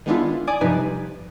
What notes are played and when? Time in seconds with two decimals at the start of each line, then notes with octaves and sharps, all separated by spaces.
0.06 D#3 G#3 B3 D4 E4 F4
0.47 D5 G#5 D6 D#6
0.61 G2 C3 F3 D#4 B4 G#5